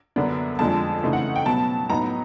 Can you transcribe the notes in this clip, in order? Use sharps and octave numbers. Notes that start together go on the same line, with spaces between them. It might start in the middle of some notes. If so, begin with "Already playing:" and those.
F#2 D3 F#3 B3 D4
F2 D3 F3 G#3 A5
C#3 E3 A3 C4 D#4
F#5
G5
B2 F#3 B3 A5
A2 F#3 B3 D#4 A#5